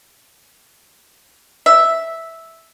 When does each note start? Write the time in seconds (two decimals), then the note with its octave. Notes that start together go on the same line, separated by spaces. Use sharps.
1.66 E5